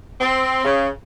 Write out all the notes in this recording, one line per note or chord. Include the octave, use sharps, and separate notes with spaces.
C4
C#3